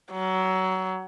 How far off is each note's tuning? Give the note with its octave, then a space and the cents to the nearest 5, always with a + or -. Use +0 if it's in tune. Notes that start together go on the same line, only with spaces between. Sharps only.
F#3 +20